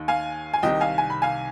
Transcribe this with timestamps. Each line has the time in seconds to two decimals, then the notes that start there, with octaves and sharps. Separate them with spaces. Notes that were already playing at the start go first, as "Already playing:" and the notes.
Already playing: D#2 D#3
0.08 F5 G#5
0.53 G#5
0.63 C2 C3 D#3 D#5 G5
0.81 F5 G#5
0.98 G#5
1.10 B5
1.22 F5 G#5